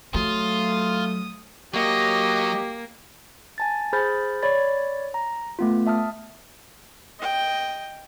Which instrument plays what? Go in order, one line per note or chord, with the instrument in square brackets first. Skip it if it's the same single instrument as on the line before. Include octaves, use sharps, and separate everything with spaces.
[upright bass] F#3 [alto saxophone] A3 [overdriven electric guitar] F4 [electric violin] D#6
[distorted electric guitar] F#3 [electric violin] A#3 [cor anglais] G4 [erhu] D#5
[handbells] G#5 A5 A6
G#4 C5 B5 F6 G6 A6
C#5 D5 B5 A6
A#5
A3 B3 F4
E5 A5 D#6 F6
[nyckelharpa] D#5 G5